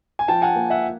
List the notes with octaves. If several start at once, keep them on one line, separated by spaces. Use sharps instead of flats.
G#5
F3 G5 A5
F#5 G#5
A#3
E5 F#5